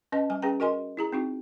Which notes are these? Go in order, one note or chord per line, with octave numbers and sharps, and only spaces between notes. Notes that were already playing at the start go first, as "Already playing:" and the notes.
C#4 B4 D#5 A5
G3 G#5
C#4 G#4 B4 G5 A#5
F#4 A#4 D#5 G#5 C6
E4 G#4 A#5
C4 D#4 F#4